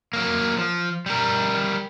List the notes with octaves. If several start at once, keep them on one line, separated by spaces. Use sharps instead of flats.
F#3 A#3
F3
G3 A#4